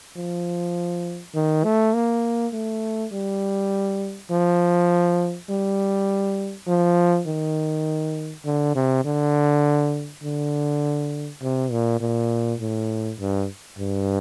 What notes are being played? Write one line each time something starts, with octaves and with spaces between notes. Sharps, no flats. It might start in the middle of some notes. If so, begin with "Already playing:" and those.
F3
D#3
A3
A#3
A3
G3
F3
G3
F3
D#3
D3
C3
D3
D3
C3
A#2
A#2
A2
G2
G2